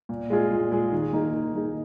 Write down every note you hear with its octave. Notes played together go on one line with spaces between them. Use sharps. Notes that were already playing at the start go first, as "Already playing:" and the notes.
A#2
G#3 F4 G#4
A#2
G#3 F4 G#4
D#3
A#3 D#4 G#4
D#3
A#3 D#4 G#4